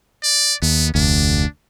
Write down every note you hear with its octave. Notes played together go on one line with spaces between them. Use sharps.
D5
D#2 B3
F1 D2 D4